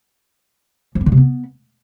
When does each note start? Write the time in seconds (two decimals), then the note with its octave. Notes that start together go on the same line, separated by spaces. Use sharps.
0.95 F3
1.01 B3
1.06 D3
1.12 C3
1.17 B3